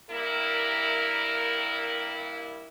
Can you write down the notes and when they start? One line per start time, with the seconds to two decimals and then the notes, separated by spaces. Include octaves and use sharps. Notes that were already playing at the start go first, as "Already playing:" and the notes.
0.11 G2 A#3 E4 A#4